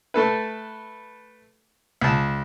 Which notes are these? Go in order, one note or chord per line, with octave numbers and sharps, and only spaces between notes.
A3 A4 B4
C#2 A5